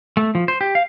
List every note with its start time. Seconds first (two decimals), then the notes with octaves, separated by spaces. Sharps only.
0.17 A3
0.35 F3
0.48 C5
0.61 G4
0.75 F5